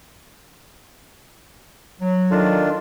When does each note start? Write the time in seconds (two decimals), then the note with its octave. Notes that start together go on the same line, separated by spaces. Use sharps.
2.01 F#3
2.31 D#3 D4 F4 A4